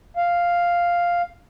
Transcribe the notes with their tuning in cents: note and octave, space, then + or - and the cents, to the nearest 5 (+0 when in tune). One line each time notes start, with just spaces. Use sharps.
F5 +0